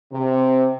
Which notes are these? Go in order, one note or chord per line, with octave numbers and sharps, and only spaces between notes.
C3